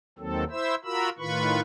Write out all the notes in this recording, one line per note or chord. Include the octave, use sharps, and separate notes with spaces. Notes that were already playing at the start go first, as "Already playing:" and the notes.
D#2 D#3 F#3 C4 A4
E4 C5 E5 E6
F4 F#4 A#4 B5 E6
A2 D#3 F4 B4 B5 C#6